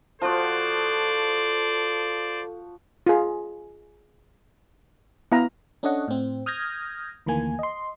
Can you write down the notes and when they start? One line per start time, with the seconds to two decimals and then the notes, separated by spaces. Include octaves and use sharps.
0.22 F3 F#4 A4 C5 D5
3.06 F4 G#4
5.32 B3 E4 F5 A#5
5.83 C#4 D4 A4 C#5 D#5 F#5
6.08 A2 C4
6.46 D#6 F6 G6 G#6 A#6
7.26 D2 D#3 E3 A#3 G#5
7.59 D#5 C6